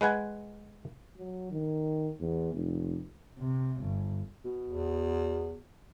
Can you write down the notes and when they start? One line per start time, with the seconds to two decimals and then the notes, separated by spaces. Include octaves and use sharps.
0.01 G#3 B4 F#5 G#5
1.17 F#3
1.52 D#3
2.20 E2
2.53 F1
3.39 C3
3.82 G1
4.45 B2
4.68 E2